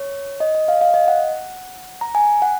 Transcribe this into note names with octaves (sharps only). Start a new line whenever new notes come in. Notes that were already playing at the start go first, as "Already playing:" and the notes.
Already playing: C#5
D#5
D#5
F5
F5
D#5
F#5
A#5
G#5
F#5